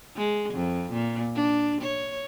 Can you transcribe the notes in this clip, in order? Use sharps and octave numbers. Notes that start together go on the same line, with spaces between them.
G#3
F2
A#2
D4
C#5